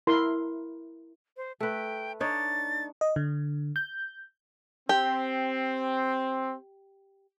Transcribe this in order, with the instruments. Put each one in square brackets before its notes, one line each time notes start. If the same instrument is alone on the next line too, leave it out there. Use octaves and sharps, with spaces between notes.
[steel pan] E4 A#4 C6
[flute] C5
[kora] A3 B4 [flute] G5
[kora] D4 D#4 C#5 [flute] A6
[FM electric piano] D#5
D3
G6
[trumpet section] C4 [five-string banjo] G4